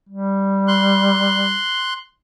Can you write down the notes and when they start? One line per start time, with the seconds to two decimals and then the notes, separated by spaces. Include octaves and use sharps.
0.09 G3
0.68 C6 F#6